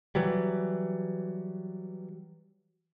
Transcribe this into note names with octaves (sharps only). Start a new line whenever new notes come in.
E3 F#3 G3